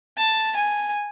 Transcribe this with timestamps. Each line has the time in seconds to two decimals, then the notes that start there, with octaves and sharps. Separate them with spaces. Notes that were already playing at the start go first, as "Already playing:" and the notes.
0.18 A5
0.57 G#5